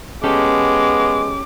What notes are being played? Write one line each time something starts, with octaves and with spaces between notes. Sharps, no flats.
G#3 B3 C#4 G4 A4 D6